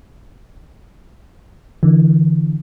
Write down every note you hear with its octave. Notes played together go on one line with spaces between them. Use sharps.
D3 E3